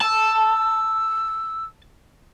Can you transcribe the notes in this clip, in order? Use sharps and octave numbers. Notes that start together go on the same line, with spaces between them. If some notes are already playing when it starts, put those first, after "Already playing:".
A5 E6